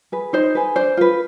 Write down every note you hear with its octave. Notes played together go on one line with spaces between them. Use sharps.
G#4 B4
D#4 C5
G#4 B4
D4 C5
F4 B4